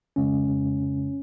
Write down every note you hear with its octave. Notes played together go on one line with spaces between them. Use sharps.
F2 C#3 G#3 C#4
F2 C#3 G#3
F2 C#3 G#3